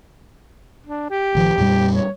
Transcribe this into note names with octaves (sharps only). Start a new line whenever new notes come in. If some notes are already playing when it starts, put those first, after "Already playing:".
D4
G4
A1 D#3 F3
F2 A#2 G3
C#5